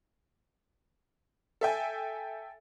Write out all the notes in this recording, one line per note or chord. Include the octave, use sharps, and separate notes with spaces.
A4 E5 G5 G#5